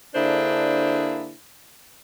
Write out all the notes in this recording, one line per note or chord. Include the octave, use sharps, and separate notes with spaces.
D3 A#3 D4 E4 G#4 C5